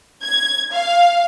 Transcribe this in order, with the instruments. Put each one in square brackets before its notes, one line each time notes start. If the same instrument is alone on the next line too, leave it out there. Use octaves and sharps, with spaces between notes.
[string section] G#6
F5